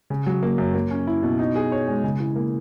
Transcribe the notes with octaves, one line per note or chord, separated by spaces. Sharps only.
C#3
F#3
A#3
F#2
A#3
C#4
E4
B2
D#4
G#4
C#5
G#3
C#3
E3
A#3